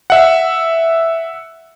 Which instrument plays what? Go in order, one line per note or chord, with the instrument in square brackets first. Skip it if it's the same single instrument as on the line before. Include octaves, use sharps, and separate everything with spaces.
[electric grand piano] E5 F#5